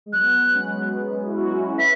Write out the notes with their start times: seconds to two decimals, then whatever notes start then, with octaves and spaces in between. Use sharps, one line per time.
0.06 G#3
0.12 F#3 B3 F#6
0.54 G#3 C#4
1.26 E4
1.36 C#4 F#4
1.73 C#5
1.77 B4 E5 B6